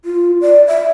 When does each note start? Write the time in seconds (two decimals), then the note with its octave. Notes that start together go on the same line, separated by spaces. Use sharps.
0.05 F4
0.41 D5
0.67 E5